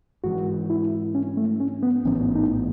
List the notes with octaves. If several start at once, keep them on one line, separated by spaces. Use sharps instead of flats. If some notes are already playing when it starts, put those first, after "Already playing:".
G#2 E3 G#3 F#4
E4
C#4
A3
C#4
B3
A1 G#2 E3 B3 C#4
D#4